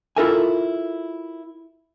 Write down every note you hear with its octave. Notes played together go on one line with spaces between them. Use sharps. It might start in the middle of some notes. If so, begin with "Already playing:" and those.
E4 F4 A4 A#4 E5 G#5